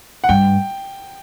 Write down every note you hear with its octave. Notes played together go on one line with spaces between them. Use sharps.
F#5
G2 G5